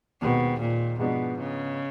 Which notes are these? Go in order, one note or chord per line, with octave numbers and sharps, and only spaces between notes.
D#2 B2 D#3 G#3 C4
A#2
G#2 B2 F3 G#3 B3 D4
C#3